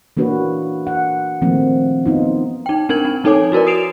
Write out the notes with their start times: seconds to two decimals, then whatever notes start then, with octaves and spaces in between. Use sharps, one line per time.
0.17 E3 A#3 D4 F#4 B4 C#5
0.87 F#5
1.42 D#3 F3 A3 A#3 C4
2.06 B3 D#4 F4
2.66 D#4 G5
2.89 C4 D4 A#4 G#6 F#7
3.05 C4
3.24 F3 D#4 A4 C#5 G#5 D6
3.52 E4 F#4 A#4 B4 D5
3.67 D#6 C7 D7 E7 F7